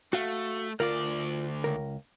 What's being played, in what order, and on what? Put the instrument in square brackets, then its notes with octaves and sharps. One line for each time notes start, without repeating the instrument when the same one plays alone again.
[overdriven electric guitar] A3 [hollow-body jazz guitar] F#4 F5
[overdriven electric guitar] D2 D5 [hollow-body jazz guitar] F4 A#4
[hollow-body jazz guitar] C#2 A#4